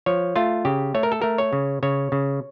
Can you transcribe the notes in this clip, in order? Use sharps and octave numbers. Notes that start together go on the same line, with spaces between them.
F3 C#5
A3 F4
C#3 G4
A3 C#5
A#4
A4
A3 A#4
C#5
C#3
C#3 C#5
C#3